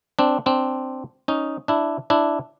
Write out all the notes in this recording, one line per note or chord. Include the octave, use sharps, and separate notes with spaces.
C4 D4
C4 D4
C#4 D#4
D4 E4
D4 E4